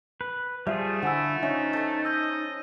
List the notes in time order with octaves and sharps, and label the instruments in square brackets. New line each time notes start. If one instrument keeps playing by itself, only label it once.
[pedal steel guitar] B4
[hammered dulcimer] F3 [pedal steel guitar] G3 F4 G#4 [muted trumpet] A3 [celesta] E5
[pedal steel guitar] D3 E4 [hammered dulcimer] F3 [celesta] F#5 G#5 E6
[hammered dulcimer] C#4 [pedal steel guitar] D#4 [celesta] E5
[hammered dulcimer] A4 A5
[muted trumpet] D#5 [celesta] E6 G6